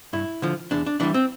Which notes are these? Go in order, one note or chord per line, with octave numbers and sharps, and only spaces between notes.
G2 E4
D3 F3
E2 D4
D4
E3 G3 D4
C4